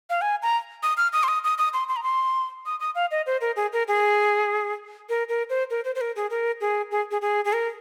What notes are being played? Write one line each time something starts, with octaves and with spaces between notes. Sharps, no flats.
F5
G#5
A#5
D#6
F6
D#6
C6
D#6
D#6
D#6
C6
C6
A#5
C6
D#6
D#6
F5
D#5
C5
A#4
G#4
A#4
G#4
A#4
A#4
C5
A#4
C5
C5
A#4
G#4
A#4
G#4
G#4
G#4
G#4
G#4
A#4